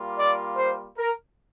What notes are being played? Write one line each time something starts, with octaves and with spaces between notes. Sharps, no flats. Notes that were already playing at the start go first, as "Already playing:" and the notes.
Already playing: G3 A#3 F4
D5
C5
A#4